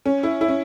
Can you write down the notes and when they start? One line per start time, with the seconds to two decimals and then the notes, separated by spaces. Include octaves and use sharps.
0.06 C#4
0.23 E4
0.41 E4
0.48 C#4